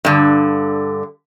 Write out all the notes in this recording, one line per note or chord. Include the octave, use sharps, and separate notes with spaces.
G2 D3